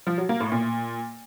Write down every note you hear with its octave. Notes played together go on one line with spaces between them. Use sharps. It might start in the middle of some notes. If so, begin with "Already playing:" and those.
F3
F#3
A#3
A2
A#2